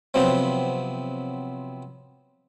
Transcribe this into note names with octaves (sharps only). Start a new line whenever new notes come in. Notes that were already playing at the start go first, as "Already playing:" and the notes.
C3 F3 F#3 B3 C4